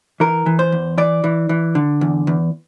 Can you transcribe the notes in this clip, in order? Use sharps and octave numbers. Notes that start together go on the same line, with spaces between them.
E3 A#4
E3
C5
E2
E3 D5
E3
E3
D3
E2
E2